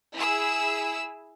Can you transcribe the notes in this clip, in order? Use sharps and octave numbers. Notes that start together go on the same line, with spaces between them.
E4 G#4 E6